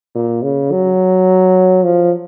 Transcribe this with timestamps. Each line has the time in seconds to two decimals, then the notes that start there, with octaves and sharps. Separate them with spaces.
0.15 A#2
0.43 C#3
0.72 F#3
1.83 F3